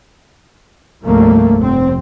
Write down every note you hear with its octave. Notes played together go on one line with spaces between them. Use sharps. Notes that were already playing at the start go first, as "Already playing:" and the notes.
C2 G2 F3 A3 A#3
F1 C4